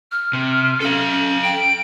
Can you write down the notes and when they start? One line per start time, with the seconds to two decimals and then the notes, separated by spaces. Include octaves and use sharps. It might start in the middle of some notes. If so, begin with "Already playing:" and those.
0.11 F6
0.33 C3
0.80 C#4 A4 F5
1.43 G5 D7
1.58 D7